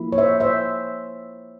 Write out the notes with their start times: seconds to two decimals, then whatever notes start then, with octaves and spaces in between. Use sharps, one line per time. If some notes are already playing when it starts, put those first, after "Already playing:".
Already playing: F3 A#3 E4
0.12 C#5
0.18 C5 E5
0.40 C5 E5